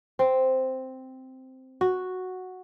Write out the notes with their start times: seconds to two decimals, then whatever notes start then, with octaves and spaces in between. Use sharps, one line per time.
0.19 C4
1.81 F#4